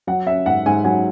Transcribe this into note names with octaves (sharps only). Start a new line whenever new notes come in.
F#3 F#5
C#4 E5
G#2 F#5
G#2 G#5
F#3 G#5